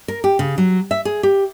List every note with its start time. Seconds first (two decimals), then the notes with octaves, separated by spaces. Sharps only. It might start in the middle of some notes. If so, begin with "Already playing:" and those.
0.08 A#4
0.24 G4
0.39 C#3
0.58 F#3
0.91 E5
1.05 G#4
1.23 G4